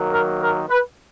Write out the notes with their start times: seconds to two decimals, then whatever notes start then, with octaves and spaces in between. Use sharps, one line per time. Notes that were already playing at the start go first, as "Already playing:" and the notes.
Already playing: D#3 F#3 A#3
0.12 A#4
0.41 A#4
0.69 B4